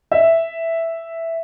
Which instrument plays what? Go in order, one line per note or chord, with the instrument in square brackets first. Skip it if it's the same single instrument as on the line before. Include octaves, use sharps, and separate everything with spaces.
[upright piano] E5